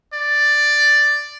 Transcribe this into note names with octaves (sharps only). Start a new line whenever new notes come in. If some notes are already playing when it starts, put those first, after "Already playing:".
D5